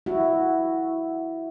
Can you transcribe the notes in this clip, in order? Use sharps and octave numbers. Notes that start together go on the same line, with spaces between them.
E4 F#4